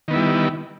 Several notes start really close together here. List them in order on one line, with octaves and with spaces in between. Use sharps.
D#3 B3 E4 G3